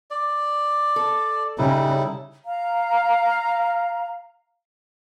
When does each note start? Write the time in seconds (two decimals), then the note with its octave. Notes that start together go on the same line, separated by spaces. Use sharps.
0.11 D5
0.96 A4
1.58 C#3 G3 D#4 E4
2.45 F5 A#5